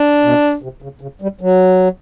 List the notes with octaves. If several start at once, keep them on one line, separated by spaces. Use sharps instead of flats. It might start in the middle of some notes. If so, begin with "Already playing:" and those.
Already playing: D4
B2
C3
C#3
C#3
G3
F#3